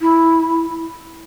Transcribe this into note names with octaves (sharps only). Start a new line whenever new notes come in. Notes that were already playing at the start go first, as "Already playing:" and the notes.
E4